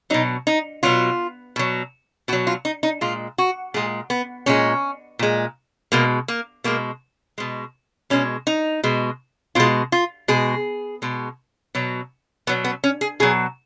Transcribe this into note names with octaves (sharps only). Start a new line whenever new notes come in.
B2 F#3 D#4
D#4
B2 F#3 F4
B2 F#3
B2 F#3 F#4
F4
D#4
D#4
A#2 G#3 F4
F#4
A#2 G#3 G#4
B3
A#2 G#3 C#4
A#2 G#3
B2 G#3 A#3
A#3
B2 G#3 A#3
B2 G#3
B2 G#3 C#4
D#4
B2 G#3
B2 G#3 F4
F4
B2 G#3 G#4
B2 G#3
B2 F#3
B2 F#3 B3
B3
C#4
G#4
B2 F#3 G#4